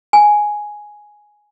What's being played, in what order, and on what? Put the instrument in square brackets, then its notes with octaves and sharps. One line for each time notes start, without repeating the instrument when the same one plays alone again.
[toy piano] G#5